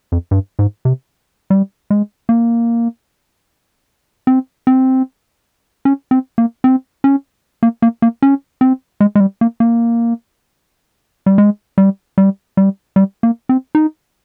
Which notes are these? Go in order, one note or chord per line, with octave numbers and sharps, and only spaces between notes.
F2
G2
G#2
C3
G3
G#3
A#3
C4
C4
C#4
C4
A#3
C4
C#4
A#3
A#3
A#3
C#4
C4
G#3
G#3
G3
A#3
A#3
G3
G#3
G3
G3
G3
G3
A#3
C4
D#4